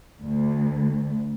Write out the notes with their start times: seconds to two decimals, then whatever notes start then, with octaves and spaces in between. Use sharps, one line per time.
0.22 D2